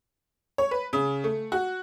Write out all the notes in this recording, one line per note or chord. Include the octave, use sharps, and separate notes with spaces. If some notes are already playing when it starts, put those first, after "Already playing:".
C#5
B4
C#3
A3
F#4